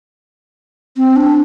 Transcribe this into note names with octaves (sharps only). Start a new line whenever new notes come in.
C4
D4